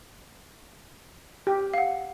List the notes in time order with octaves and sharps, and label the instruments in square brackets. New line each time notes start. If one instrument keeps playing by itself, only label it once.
[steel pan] G4
[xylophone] F5 F#5